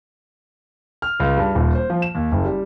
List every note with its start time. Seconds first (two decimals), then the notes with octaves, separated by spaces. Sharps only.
1.02 F6
1.20 C#2
1.37 G2
1.55 D#1
1.75 C5
1.90 F3
2.02 E7
2.15 D#2
2.32 F#1
2.45 G3